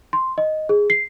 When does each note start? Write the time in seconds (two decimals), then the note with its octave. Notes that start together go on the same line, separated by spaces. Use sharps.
0.13 C6
0.38 D#5
0.69 G#4
0.90 C7